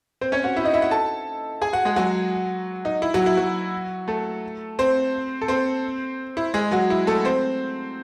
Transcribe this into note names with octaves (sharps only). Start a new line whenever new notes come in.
C4 C5
C#4 C#5
F#4 F#5
E4 E5
D#4 D#5
E4 E5
F#4 F#5
A4 A5
G#4 G#5
F#4 F#5
G#3 G#4
F#3 F#4
D#4
E4
F#3 F#4
E4
F#3 F#4
A3 A4
C4 C5
A4
C4 C5
E4
G#3 G#4
F#3 F#4
E4
A3 A4
C4 C5